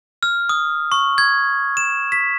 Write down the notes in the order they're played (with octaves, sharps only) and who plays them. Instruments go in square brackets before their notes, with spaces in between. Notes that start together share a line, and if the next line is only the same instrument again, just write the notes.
[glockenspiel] F6
D#6
C#6
G#6
E7
B6